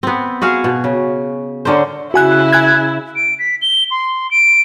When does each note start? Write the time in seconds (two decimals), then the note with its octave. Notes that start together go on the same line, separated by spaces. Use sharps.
0.03 B3 C4
0.42 F#4 G#4 F5 F#5
0.64 B2
0.84 C#3
1.65 D3 C#4 A#4 C5
2.14 C#3 E4 F#4 G#5 F#6
2.52 G#5 F#6 G#6
3.16 D7
3.39 B6
3.62 G7
3.91 C6
4.31 D7